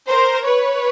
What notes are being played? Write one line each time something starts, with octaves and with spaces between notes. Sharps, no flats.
A#4 C5
B4 C#5